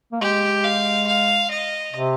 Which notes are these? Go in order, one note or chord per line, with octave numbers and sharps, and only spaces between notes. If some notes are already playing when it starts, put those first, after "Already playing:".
A#3
G#3 G4
F5
F5
D#5
C3